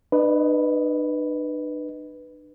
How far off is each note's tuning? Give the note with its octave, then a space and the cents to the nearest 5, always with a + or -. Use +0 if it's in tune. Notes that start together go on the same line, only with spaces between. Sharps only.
D4 +45 B4 +0 D#5 +5